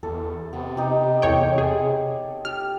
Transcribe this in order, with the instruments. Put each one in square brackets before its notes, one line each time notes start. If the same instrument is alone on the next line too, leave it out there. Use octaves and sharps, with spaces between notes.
[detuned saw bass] E2 [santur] A4
[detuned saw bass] C3 [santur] B3
[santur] D#4 G4
[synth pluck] E2 C#5 G5 [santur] A4
[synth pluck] G#4 [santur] C#5
[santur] G4 [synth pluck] F6